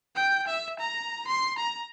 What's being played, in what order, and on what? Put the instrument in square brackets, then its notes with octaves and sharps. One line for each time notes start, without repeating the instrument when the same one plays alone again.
[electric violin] G5
E5
A#5
C6
A#5